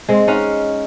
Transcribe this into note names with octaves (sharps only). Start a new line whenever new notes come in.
G#3 C4
C#4 D#4 F5 F#5